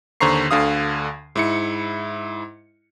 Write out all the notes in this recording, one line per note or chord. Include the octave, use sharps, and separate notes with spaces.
D#2 D3 C5 A#5 C#6 C7
D2 D3 F5 D#6
G#2 E4 C#7